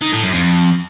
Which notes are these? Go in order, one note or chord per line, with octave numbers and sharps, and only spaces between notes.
D#3
A2
F#2
F2